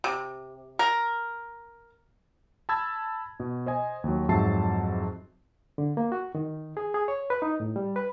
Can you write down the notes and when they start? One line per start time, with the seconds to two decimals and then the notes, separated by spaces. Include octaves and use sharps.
0.04 C3
0.79 A#4
2.69 A5 B5 E6 G#6
3.40 B2
3.66 C5 D#5 G#5
4.04 D#2 F#3
4.29 F2 G#2 F#3 E5 A5 C7
5.78 D3
5.97 A#3
6.12 F#4
6.35 D#3
6.77 G#4
6.94 G#4
7.08 C#5
7.30 B4
7.42 D#4
7.60 A2
7.76 G3
7.96 B4